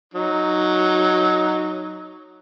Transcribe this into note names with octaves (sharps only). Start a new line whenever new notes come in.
F#3 D#4